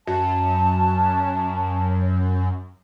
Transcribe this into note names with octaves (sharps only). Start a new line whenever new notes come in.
F#2 A5